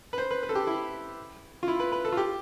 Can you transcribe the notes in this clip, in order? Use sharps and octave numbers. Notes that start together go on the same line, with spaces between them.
B4
C5
B4
B4
A4
G4
E4
F4
E4
B4
B4
A4
F4
G4